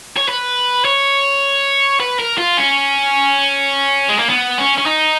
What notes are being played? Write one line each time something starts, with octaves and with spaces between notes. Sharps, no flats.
C#5
B4
C#5
B4
A#4
F4
C#4
G#3
A#3
B3
C#4
C#4
D#4